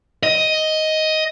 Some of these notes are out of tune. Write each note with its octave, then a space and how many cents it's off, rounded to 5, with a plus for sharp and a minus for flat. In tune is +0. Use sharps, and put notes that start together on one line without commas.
D#5 +10